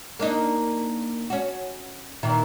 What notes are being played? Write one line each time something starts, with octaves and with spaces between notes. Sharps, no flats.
A#3 D4 D#4
C#4 F#4
A#2 D#3 E3